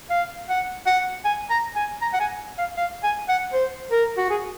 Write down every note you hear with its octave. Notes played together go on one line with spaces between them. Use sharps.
F5
F#5
F#5
G#5
A#5
G#5
A#5
F#5
G#5
F5
F5
G#5
F#5
C5
A#4
F#4
G#4